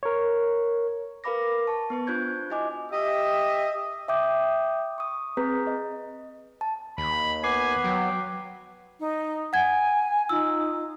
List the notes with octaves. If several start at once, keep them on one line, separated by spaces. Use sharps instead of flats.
A#4 C#5
A#4 B4 F5 B5 D6 A#6
A5 C#6
B3 B4 C#6
D4 F4 C5 G6 G#6
E4 F#4 D#5 G#5 D6
G4 D#5 E5
E5 G5 D6 D#6 G6
C#6 D#6
C4 G#4 B4 A#5 G6 B6
D#5
A5
D#2 B5
B3 G#5 D6 C7
F#3 G5
D#4
F#5 G#5 G#6
D#4 F4 E6